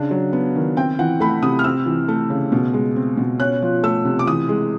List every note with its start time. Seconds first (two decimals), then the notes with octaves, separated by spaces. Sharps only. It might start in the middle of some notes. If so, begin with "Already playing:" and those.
Already playing: C#3 D4
0.11 F#3
0.33 B3
0.56 D#3
0.76 C4 G5
0.99 E3 F#5
1.20 A3 B5
1.42 C3 D#6
1.59 F6
1.64 C4 E6
1.86 E3
2.08 A3
2.30 C#3
2.52 B2
2.74 G#3
2.96 C4
3.17 B2
3.40 C#4 F#6
3.62 F3
3.83 A3 E6
4.05 C3
4.19 D6
4.27 E3 D#6
4.49 G#3